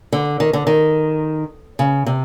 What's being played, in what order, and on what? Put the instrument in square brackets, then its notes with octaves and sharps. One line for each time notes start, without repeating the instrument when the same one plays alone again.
[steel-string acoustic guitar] D3
D#3
D3
D#3
C#3
C3